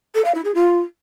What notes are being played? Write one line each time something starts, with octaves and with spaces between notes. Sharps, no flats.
A4
F5
E4
G#4
F4